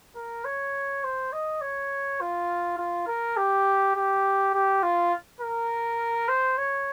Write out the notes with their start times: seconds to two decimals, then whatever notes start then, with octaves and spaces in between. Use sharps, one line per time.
0.16 A#4
0.45 C#5
1.04 C5
1.33 D#5
1.61 C#5
2.21 F4
2.78 F4
3.07 A#4
3.37 G4
3.96 G4
4.54 G4
4.83 F4
5.41 A#4
6.28 C5
6.58 C#5